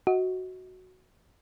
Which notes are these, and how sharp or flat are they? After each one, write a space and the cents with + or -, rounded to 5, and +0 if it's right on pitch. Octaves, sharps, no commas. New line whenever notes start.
F#4 +0 D#5 +35